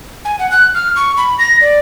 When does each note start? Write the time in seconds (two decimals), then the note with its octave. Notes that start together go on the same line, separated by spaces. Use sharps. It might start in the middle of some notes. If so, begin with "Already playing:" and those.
0.25 G#5
0.39 F#5
0.51 F#6
0.75 F6
0.96 C#6
1.17 B5
1.39 A#6
1.61 D5